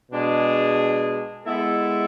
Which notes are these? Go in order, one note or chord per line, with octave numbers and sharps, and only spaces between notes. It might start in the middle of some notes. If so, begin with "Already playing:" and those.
B2 G#3 D4 G#4
G#3 B3 E4 A4